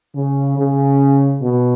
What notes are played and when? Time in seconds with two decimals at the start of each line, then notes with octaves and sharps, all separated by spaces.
0.16 C#3
0.58 C#3
1.42 B2